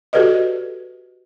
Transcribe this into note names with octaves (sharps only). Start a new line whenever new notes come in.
F#4 G4 A4 B4 D5 D#5